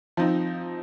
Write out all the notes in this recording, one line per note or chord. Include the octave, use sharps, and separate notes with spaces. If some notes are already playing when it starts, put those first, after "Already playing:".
F3 C4 D#4